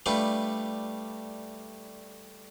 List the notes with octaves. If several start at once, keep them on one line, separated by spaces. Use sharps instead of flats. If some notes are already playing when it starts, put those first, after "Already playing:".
G3 A3 D4 F4 A4 B4